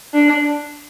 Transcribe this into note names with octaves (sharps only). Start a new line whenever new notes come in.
D4